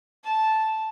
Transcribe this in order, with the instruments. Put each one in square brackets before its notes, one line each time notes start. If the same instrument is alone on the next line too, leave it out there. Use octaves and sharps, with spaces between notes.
[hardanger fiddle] A5